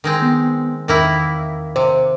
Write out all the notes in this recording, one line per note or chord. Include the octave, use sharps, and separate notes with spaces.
D#3 G#3 C4
B3
E2 D#3 A#3 E4
C3 C5